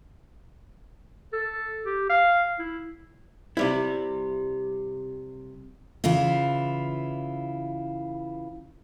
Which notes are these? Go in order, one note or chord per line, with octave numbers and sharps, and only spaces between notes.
A4
G4
F5
E4
C3 G3 E4
C#3 E3 E4 F4